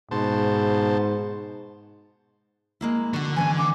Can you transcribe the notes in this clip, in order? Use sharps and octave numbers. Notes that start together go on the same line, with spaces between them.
G#2 B2 C5 A5
G#3 A#3 E4
D3 F#4 F#5
E3 G#3 C#4 G#5
D6